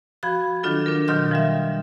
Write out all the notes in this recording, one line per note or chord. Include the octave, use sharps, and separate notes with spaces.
F3 F#4 B5 G#6
D#3 F#3 D4 F4 A4
D4 A#4
B2 D#3 F#3 C6 F6 G6
F3 G3 E5